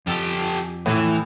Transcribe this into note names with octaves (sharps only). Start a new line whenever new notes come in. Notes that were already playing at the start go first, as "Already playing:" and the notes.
F2 F3 G4 A4
A2 E3